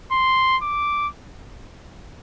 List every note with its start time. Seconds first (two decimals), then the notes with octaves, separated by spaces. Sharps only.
0.12 C6
0.62 D6